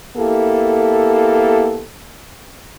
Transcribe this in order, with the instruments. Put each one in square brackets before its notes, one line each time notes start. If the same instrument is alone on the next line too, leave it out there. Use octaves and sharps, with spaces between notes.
[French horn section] A#3 B3 E4 G4 A4